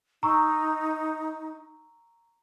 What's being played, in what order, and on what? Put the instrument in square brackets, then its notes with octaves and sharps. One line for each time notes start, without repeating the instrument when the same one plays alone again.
[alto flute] D#4 [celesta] A#5 C#6 E6